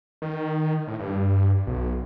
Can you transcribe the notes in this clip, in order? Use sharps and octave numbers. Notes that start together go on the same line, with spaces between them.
D#3
A2
G2
B1